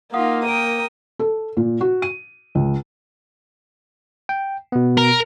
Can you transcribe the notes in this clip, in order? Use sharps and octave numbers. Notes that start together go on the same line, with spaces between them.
A#3 D#4 F4 F5 F#5 D#6
A#4 G5 D#6 D7 D#7
A4
A#2
F#4
D#7
C#2
G5
B2 B3
A#4